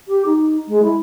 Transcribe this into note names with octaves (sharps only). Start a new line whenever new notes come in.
G4
D#4
G#3
E4